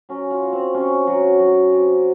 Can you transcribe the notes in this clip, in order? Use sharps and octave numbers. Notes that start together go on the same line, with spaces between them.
F#3 C#4
F4
F#3
C4
C3 C#4
F#3
F#3
C3